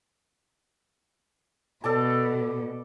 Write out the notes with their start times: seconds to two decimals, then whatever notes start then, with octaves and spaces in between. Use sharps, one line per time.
1.84 B2 A4 D5 A5